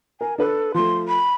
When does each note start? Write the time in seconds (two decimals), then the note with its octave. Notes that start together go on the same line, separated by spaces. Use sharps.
0.21 A#4 G#5
0.38 D4 A4 B4
0.74 F3 A3 C6
1.08 B5